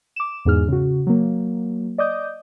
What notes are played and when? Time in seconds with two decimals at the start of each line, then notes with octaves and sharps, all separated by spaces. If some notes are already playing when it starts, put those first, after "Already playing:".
0.16 D6 E7
0.45 E2 G#2 G#4 F6
0.68 C#3 F#4
1.07 F#3 A#3
1.98 D5 D#5 D6 D#6 G6